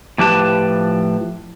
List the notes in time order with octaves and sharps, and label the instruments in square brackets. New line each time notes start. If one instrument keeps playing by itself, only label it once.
[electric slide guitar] A2 F3 G4 B4 A5